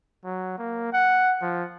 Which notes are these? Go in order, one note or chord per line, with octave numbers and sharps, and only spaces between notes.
F#3
A#3
F#5
F3